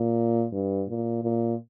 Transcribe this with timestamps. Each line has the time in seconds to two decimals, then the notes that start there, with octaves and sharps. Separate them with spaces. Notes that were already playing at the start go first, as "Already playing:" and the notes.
Already playing: A#2
0.52 G2
0.89 A#2
1.23 A#2